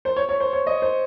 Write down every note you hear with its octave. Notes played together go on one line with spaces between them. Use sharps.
C5
C#5
C#5
C5
C#5
D#5
C5